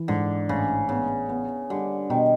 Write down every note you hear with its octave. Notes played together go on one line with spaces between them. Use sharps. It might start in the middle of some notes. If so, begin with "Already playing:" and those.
Already playing: E3
G#2 D3
A1 C#3
C#3 B3
B3
D3 G3
B2 D#3